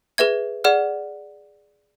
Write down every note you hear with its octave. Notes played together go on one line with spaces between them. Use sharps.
G#4 B4 E5 G#6
G#4 D5 F#5 F6